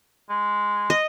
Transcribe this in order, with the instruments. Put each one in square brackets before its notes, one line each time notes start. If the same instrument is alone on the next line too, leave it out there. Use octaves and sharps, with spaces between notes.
[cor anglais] G#3
[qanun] D#5